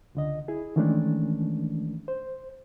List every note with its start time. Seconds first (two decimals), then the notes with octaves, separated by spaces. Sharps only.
0.15 C#2 D3 D#5
0.48 E4 G#4
0.76 D#3 E3 G#3 A3 C#4 D4
2.08 C5